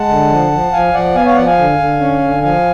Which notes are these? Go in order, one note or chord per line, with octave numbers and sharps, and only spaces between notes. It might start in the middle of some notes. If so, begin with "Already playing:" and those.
Already playing: G#3 F#5 A5
D3
F3
F3
F3 F5 G#5
F3 D5 F#5
B3 F5 G#5
C#5 F5
F3 D5 F#5
F5 G#5
D3
D3
C#4
D3
F3 F5 G#5